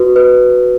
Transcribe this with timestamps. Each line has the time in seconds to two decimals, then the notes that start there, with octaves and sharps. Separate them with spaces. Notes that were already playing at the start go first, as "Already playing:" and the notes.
Already playing: F#4 B4
0.16 B4